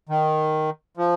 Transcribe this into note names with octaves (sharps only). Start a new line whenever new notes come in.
D#3
F3